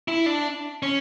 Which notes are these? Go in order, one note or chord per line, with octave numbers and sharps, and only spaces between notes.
E4
D4
C#4